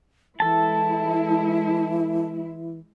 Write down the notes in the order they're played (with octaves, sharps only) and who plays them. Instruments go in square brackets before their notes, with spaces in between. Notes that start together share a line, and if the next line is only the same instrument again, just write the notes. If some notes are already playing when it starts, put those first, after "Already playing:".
[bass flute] E3 [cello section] G#3 E4 [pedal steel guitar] A4 A5